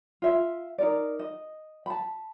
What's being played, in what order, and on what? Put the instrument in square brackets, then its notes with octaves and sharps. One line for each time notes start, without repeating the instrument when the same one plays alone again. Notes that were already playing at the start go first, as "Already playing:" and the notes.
[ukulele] F4 E5
D#4 A#4 D5
D#5
A5 B5